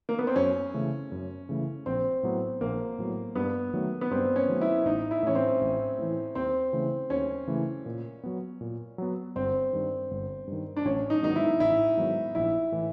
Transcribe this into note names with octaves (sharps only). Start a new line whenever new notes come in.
A#3
B3
C4
F#2 C#4
C#3 E3 A3
F#2
C#3 E3 A3
A#1 C4
A2 F#3 B3
A#1 A#3
A2 F#3 B3
G2 B3
D#3 F#3 A3
B3
G2 C4
C#4
D#3 F#3 A3
E4
A1 D#4
E4
A2 E3 C#4
C4
A1
A2 E3
D#2 C4
C#3 E3 A3
D#2 C#4
C#3 E3 A3
A#2
F#3 B3
A#2
F#3 B3
G1 C4
G2 D#3
G1
G2 D#3
D4
A1 C#4
D#4
G#2 D#3 F#3 B3 D#4
E4
A1 E4
G#2 D#3 F#3 B3
A#1 E4
A2 E3